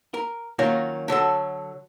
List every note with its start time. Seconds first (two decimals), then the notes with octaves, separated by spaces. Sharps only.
0.14 A#4
0.59 D#3 F#3 A#3 C#4 F4
1.08 D3 F#3 F#4 A4